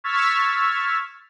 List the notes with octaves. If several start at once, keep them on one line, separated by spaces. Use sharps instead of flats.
C#6 E6 F6 G#6 A6 B6